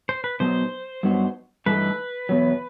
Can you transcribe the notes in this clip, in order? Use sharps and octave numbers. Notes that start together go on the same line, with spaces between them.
C5
B4
B2 F#3 B3 D#4 C5
G2 F#3 B3 D#4 F#4
G2 E3 A3 D#4 A4 B4
E2 B2 F#3